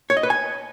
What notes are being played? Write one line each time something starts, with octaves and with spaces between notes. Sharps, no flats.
C#5
D#5
B4
G#5